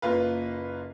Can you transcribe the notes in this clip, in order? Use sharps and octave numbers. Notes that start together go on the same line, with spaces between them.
F#1 A#3 F4 B4